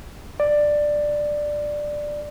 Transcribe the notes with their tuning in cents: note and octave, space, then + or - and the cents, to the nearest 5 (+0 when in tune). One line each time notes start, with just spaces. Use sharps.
D5 +10